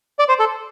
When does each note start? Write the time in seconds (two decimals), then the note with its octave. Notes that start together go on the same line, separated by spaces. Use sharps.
0.19 D5
0.29 C5
0.40 A4